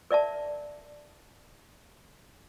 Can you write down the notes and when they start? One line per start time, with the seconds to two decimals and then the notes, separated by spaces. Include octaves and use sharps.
0.11 A#4 D5 E5 A5